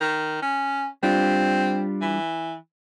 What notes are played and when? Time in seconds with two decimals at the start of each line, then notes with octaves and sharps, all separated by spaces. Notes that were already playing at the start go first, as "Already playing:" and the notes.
0.01 D#3
0.42 C#4
1.03 G3 C4 D4 F4
2.01 E3